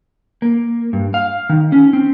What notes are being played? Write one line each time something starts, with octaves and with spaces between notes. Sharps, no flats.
A#3
G2
F5
D#3
C#4
C4